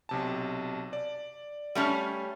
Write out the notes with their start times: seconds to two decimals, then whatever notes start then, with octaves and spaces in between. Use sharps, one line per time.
0.09 B1 C3 A5
0.93 D5
1.75 G3 A3 C#4